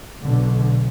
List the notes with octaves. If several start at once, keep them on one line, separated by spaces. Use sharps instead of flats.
B1 B2 D3